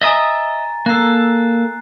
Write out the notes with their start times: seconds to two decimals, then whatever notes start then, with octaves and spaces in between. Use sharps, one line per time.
0.01 D#5 E5 G#5 A#5 D#6 A6
0.86 A#3 A4 F#6 C7